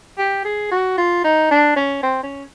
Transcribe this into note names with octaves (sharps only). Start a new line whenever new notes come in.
G4
G#4
F#4
F4
D#4
D4
C#4
C4
C#4